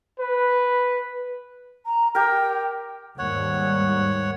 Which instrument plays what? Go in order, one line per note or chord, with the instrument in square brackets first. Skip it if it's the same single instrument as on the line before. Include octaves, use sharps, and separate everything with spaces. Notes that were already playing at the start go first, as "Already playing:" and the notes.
[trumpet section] B4
[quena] A#5
[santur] G4 A#4 [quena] G5
[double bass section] D#2 G#2 G3 [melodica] C#5 F#5